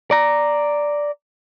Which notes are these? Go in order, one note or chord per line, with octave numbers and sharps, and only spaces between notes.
D5 A#5